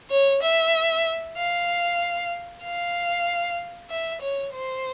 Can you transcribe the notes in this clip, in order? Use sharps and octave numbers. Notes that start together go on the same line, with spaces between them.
C#5
E5
F5
F5
E5
C#5
C5